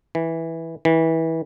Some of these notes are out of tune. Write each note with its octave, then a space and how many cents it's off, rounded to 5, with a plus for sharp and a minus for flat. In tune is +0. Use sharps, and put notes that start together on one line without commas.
E3 -10
E3 -25